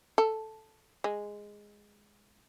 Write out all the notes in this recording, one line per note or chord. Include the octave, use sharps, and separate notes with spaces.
A4
G#3